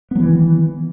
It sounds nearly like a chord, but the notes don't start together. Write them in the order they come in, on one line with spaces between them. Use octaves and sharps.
B3 F#3 E3 D#3